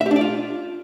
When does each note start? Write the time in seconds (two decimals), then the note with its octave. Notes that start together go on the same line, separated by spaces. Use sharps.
0.01 E5
0.06 G4
0.11 D4
0.16 D5
0.21 F4